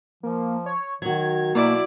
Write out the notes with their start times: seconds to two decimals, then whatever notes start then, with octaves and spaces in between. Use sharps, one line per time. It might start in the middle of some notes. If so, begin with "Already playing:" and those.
0.23 F3 A#3
0.66 C#5
1.02 D#3 F#3 F#4 G#6
1.55 B2 A#3 E4 D5